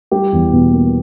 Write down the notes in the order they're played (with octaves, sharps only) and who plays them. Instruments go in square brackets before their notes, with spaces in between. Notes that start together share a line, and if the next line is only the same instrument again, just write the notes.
[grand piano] G3 G4
E2
B2
A#3